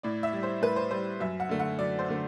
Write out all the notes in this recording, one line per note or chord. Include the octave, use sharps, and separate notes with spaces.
A2 D5
E5
G3
C5
A2 B4
C5
G3 C5
F#2 E5
F#5
D3 A3
F#5
F#2 D5
C5
D3 A3